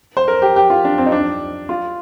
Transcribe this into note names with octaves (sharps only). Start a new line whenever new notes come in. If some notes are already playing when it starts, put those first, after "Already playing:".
C5
A#4
G4
G4
F4
D4
C4
D#4
D4
F4